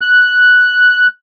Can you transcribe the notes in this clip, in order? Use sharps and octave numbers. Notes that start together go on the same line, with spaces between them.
F#6